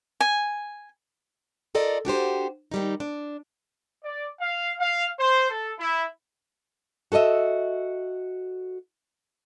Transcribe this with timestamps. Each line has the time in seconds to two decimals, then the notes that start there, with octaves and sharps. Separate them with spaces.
0.20 G#5
1.75 F4 A4 A#4 D5 D#5
2.05 D4 F#4 G4 C5
2.71 D#3 G3 D#4
3.00 D4
4.04 D5
4.40 F5
4.80 F5
5.19 C5
5.50 A4
5.79 E4
7.12 F#4 A4 C#5 D#5 E5